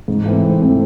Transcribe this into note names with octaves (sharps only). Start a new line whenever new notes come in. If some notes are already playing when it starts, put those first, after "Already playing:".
G#2
E3 A3 C4
G#2
E3 A3 C4